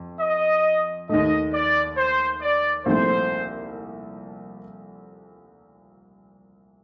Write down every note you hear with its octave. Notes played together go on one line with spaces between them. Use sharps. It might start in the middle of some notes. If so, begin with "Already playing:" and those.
Already playing: F2
D#5
D#2 D#3 A3 D#5
D5
C5
D5
C2 A#2 F3 A3 C4 C5